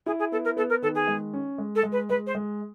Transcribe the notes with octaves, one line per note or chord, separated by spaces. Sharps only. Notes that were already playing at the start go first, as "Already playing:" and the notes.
E4 G#4
G#4
B3 A4
A#4
B3 A4
A#4
D#3 A4
G#4
G#3
C#4
G#3
A4
G#3
B4
G#3 B4
C5
G#3